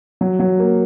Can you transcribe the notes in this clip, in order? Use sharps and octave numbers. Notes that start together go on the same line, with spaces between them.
F#3
F#3
A#3